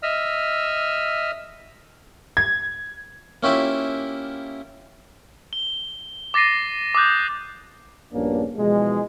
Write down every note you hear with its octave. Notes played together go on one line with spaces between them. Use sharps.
D#5 E5 E6 F6
G#6
A#3 C#4 E4 F4 G4 E5
G7
D6 A6 A#6 C7 D#7
D6 D#6 F#6 G6
A#1 G2 A#3 B3 C#4 D4
B2 E3 F3 G#3